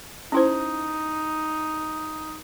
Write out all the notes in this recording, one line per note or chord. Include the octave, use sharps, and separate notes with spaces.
C#4 D#4 E4 C5